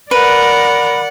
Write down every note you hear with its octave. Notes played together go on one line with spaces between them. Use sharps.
A#4 B4 D5 F#5